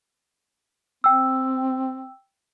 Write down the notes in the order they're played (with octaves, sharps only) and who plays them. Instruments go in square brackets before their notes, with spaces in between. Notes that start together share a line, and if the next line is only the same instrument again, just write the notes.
[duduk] C4 [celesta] G5 E6